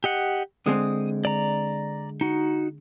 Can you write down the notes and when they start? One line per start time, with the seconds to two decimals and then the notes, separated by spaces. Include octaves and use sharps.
0.04 G4 D#5 F#5
0.66 D3 G#3 C4 D#6
1.25 D5 A#5
2.21 D#4 F#4